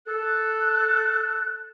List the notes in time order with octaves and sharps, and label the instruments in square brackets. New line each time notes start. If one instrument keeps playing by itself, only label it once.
[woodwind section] A4 [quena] F#6